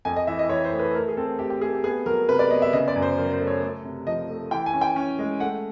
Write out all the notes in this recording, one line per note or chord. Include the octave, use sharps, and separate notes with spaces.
F2 G#5
D#5
E3 E5
D#5
E3 C#5
C5
A3
B4
A3 A#4
G#4
C4 A4
A3 G4
G4
A3 G#4
G4
B3 G#4
F#3 A#4
C3 B4
D5
B3 D#5
E5
C#3 D#5
D5
F#2
C5
F#3 A#4
C5
A3
C#5
A3
C3
F3 D#5
A3
E3 G5
G#5
C#4
G5
C#4
G#3
A3 F#5